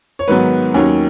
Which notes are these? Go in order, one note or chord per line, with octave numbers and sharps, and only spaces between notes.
C#5
G#2 D#3 F#3 B3 B4
D#2 D#3 F#3 C#4 C#5